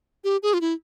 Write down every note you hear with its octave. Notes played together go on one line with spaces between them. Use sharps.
G4
G#4
F4
E4